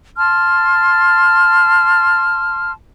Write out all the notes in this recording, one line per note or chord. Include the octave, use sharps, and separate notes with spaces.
A5 C6 F6